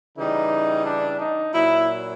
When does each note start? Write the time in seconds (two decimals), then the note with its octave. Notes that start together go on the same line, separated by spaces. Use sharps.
0.16 C#3 E3 G3 D#4
0.84 D4
1.18 D#4
1.53 A#2 F#3 E4